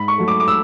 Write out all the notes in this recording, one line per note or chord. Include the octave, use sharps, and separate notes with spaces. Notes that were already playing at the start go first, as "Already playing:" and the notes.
Already playing: G#2 B5
C#6
F#3 A3
D6
D6
E6